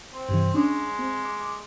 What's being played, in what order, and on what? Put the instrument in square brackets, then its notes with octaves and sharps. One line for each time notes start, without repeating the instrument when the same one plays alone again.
[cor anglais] C4
[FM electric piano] G2 C3 E3
[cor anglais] G#3 [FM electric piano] C#4 D4
[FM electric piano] C4
D6